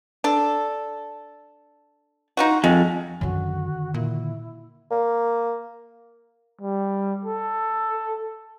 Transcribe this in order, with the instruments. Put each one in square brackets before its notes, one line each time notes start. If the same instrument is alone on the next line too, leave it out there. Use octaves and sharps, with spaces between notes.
[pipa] D4 A4
D#4 F4 F#4
[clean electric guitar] F2 [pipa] G#3
[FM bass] F#2 [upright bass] D3 D#3 [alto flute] F#4
[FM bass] A#2 [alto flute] E4
[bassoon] A#3
[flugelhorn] G3
A4